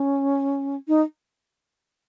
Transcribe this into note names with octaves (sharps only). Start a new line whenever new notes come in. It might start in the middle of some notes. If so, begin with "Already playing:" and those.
Already playing: C#4
D#4